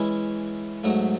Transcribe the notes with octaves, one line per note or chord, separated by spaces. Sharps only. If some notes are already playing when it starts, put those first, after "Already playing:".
Already playing: E3 G#3 C#4 E4
G#2 F#3 A3